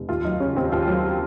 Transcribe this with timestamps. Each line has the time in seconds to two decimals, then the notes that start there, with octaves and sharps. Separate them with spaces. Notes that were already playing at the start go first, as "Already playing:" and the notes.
Already playing: F1
0.09 D#2 F4
0.24 F#3 D#4
0.40 C#3 C#4
0.56 D#2 C4
0.72 D#2 F4
0.87 F#3